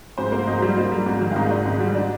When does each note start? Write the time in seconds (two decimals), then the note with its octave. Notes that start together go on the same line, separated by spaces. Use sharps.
0.18 G#2 C5
0.32 A#3
0.47 G#2 D#5
0.62 G3
0.77 A#3
0.92 G3
1.06 G#2
1.21 D#3
1.32 F5
1.36 G#2 D#5
1.51 D4
1.65 G#2
1.80 G3
1.95 D4